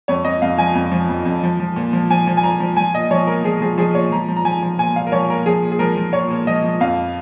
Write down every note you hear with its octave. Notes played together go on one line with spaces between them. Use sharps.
F2 C#5
F2 D#5
F2 F5
F3 G#5
F2
F3
F2
F2
F3
F3
A#2
F3
F3 G#5
F3
G#5
F3 A#5
F3
F3 G#5
A#2 D#5
F3 C#5
A#2 A#4
F3 G#4
F3 G#4
F3 G#4
A#2 C#5
F3 A#5
F3
A#5
F3 G#5
F3
A#2 G#5
A#2 F5
A#4
F3 C#5
A#2 A#4
F3 G#4
A#2
G#4
F3 A#4
F3
A#2 C#5
A#2
F3 D#5
F3
F2 F5